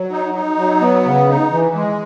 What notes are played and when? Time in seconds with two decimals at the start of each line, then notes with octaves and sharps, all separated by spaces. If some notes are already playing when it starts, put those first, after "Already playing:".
Already playing: F#3
0.11 D#4
0.34 D#4
0.58 F#3
0.81 B3
1.05 C#3
1.28 D#4
1.51 E3
1.75 G#3